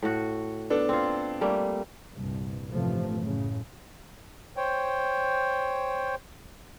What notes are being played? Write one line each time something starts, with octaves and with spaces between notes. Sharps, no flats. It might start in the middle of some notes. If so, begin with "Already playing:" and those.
A2 F#4
B3 D4 A4
C4 F4
G3 A3 A#3
C2 G2 A#2
A1 G2 C3 F3 A3
F#2 A2 C#3
C5 C#5 G5